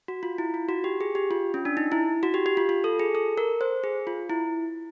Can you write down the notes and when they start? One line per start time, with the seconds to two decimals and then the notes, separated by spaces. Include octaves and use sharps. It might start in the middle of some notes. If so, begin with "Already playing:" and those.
0.08 F#4
0.23 F4
0.38 E4
0.54 F4
0.69 F#4
0.84 G4
1.01 G#4
1.15 G4
1.31 F4
1.54 C#4
1.65 D4
1.77 D#4
1.92 E4
2.23 F#4
2.34 G4
2.46 G4
2.57 F4
2.69 F4
2.84 A4
2.99 G#4
3.15 A4
3.38 A#4
3.61 C5
3.84 G#4
4.07 F4
4.30 E4